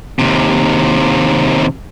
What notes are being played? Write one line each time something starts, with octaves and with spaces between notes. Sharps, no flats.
D#2 C3